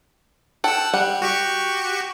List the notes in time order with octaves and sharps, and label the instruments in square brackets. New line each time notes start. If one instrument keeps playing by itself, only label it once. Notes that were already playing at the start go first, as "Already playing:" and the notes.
[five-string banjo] A4 G5 [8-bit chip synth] F#5 E6
[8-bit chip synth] G3 [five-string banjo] F#5
[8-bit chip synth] F#4 G4 C#6